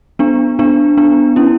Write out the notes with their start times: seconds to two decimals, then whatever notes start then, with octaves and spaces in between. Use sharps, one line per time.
0.19 B3 D4
0.59 B3 D4
0.97 B3 D4
1.36 C#4 E4